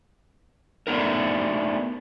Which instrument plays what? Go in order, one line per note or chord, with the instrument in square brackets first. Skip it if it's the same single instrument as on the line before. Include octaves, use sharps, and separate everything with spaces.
[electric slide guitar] A3 B3 D4 D#4 A#4